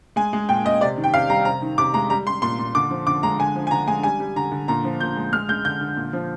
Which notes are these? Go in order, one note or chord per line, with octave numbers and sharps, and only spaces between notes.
G#3 G#5
G#3
A#2 G5
A#2 D#5
C3 D5
D#3
G5
C3 F5
G3 A#5
C3 A#5
D#3
C3 D6
G#3 A#5
G3 A#5
G3 C6
A#2 C6
A#2
D3 D6
F3
D3 D6
G#3 A#5
D3 G#5
F3
G#5
D3 A#5
G#3 G#5
G3 G#5
G3
D3 A#5
D3
A#2 A#5
F3
A#2 G6
G#3
G#3 F6
G#3 G6
D3 G6
D3
A#2
F3